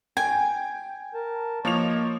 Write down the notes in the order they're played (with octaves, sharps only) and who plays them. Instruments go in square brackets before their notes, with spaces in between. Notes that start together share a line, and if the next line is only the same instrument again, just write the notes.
[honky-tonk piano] G5 [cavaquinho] G#5
[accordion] A#4 A5
[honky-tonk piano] F3 F7 [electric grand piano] A#3 [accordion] C#5 D#5 C#6